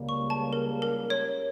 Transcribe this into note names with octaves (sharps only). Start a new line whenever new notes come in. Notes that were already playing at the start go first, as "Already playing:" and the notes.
Already playing: C#2 C#3 G3 A#3
C#6
A5
A#4
A#4
C#5